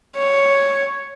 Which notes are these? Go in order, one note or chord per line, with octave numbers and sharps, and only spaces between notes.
C#5